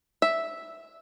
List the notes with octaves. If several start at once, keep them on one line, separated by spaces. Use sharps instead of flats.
E5